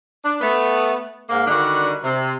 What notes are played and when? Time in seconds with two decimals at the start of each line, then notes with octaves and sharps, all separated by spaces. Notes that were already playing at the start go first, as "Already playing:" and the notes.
0.24 D4
0.41 A3 B3
1.29 G#2 A#3
1.47 D3 D#3 G3 D4 F#4
2.03 C3